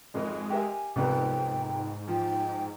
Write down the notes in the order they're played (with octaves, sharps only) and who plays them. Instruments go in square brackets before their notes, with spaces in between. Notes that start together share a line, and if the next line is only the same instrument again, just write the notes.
[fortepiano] G#1 F2 A#4 [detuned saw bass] G#3
[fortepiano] G4 A#4 E5 [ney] G#5
[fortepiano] C2 F2 B3 [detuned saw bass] G#2 [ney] G5
[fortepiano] F3 [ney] G5